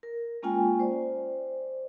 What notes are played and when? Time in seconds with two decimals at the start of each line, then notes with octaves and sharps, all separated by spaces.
0.03 A#4
0.43 G#3 A#3 C#4 F4 G5 G#5
0.80 C5 D5